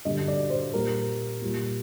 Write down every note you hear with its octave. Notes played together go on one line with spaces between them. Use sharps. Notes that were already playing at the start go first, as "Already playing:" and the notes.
G2 D3 G3 D#5
D5
C5
A#2 G3 A#4
A#2 G3